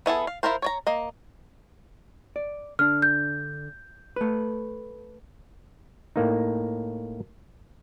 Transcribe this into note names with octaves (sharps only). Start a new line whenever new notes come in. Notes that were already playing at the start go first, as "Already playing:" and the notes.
B3 E4 G#4 A4
F5
E4 F4 A#4 C5
C#5 D5 A#5
A#3 D#5
D5
D3 D4 F6
G6
A3 B4
A2 A#3 D#4